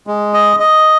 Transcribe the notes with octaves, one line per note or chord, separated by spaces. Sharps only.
G#3
D#5
D#5